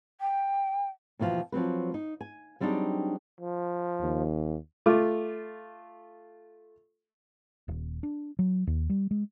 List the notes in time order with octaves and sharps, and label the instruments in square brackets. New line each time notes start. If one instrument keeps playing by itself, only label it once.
[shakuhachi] G5
[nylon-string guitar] D#2 B2 E3 F3 F4
F3 F#3 C4 B4
D#4
G#5
F#3 G3 C4 D4 D#4 G#4
[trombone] F3
[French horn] D#2
[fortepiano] A3 F4 D6
[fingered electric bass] D#1
D4
F#3
D#2
G3
G#3